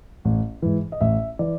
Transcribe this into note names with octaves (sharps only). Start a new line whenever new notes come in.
A1
G#2 E3
D#5
A1 E5
E3 D5